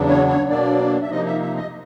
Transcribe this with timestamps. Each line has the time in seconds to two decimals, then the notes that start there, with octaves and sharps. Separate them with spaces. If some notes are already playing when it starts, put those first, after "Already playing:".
Already playing: E2 C#3 F#3 B3 D4
0.08 C#5
0.28 C#5
0.49 B2 F#3 A#3 D4 D5
1.02 E5
1.10 C3 F3 A#3 D#4 D#5
1.26 E5
1.42 E5
1.56 D#5